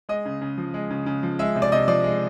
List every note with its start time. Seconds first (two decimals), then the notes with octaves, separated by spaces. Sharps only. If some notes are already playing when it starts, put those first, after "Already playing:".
0.09 G#3 D#5
0.25 C#3
0.41 C#3
0.58 F3
0.74 G#3
0.90 C#3
1.06 C#3
1.23 F3
1.39 G#3 E5
1.55 C3
1.62 D5
1.72 C3 D#5
1.88 F3 D5
2.04 G#3